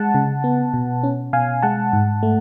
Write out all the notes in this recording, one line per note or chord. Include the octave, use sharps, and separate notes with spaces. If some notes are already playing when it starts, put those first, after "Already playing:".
Already playing: G#3 F#5 A5
C#3
B3
B2
C#4
B2 F5 G#5
G#3 F#5 A5
G#2
A3